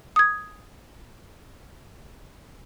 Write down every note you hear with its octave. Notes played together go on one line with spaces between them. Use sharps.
D#6 G#6